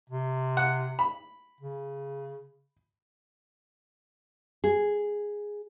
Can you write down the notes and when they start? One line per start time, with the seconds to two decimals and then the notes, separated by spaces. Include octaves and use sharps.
0.10 C3
0.57 F#5
0.99 B5
1.61 C#3
4.64 G#4